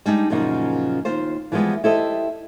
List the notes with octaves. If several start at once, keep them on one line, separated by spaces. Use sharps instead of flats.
G3 G#3 D4 D#4
F#2 A#2 C#3 F3 D#4 F#4
D#2 F4 C5
E3 F3 G3 G#3 B3
E4 G4 A4 C5 D#5